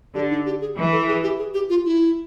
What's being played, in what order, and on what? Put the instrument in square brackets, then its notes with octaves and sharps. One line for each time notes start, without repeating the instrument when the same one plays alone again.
[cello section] D3 [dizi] G4
[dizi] D#4
G4
G#4
[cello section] E3
[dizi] A4
G#4
G4
G#4
G4
F4
E4